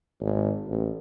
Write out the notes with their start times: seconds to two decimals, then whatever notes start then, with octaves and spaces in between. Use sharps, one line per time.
0.20 G#1
0.68 A1